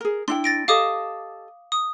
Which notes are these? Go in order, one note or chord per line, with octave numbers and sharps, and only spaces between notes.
G#4 A#4
D4 E4 G5 C6
A6 A#6 D7
G4 A4 D#5 F5 D6 D#6
D#6